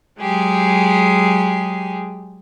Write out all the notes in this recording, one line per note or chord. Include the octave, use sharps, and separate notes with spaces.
F#3 G#3 G4 G#4